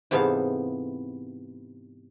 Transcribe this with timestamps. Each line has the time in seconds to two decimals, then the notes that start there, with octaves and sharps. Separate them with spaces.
0.11 G#2 C3 E3 B3 A4 F5